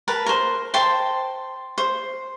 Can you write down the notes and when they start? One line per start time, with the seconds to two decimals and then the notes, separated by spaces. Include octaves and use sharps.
0.08 A#4 B4 A5
0.26 A#4 C5
0.74 C5 G5 A5 C6
1.78 C5